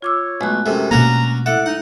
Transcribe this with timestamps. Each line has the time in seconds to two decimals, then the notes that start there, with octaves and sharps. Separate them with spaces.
0.02 F4 C#5 D6 E6
0.41 B1 G#3 A3 F#6
0.66 F#2 C3 A4
0.91 B2 A#3 C#4 D4 F#4 A#5
1.46 E4 A4 E5 F#5 D6
1.66 D#4 F#5